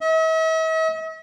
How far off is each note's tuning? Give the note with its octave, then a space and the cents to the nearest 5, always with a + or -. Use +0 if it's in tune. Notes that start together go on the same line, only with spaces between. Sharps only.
E5 -45